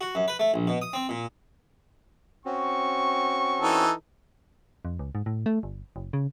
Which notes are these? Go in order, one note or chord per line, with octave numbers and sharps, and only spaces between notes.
F#4
F#2
B4
A3
A#1
B2
D#6
C4
A#2
C4 C#4 F#4 C#6
E3 D#4 A4
F2
C#2
G#2
A2
A3
G1
F#1
C#3